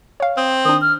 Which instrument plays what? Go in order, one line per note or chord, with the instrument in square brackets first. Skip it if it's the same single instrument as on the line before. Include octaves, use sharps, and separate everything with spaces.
[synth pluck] C#5 F5
[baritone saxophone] C4 [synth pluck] D#6
[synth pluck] D#3 D4 [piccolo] D#6
[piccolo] F6